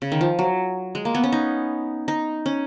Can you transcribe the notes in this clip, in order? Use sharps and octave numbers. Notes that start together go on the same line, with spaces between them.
C#3
D#3
F3
F#3
G#3
A#3
B3
C#4
D#4
D#4
C#4